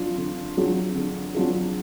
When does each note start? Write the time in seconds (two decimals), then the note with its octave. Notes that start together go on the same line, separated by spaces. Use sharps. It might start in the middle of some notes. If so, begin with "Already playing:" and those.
Already playing: F#3 D4 F4
0.18 D3
0.57 F#3 D4 F4 G#4
0.96 D3
1.35 F#3 D4 F4 G#4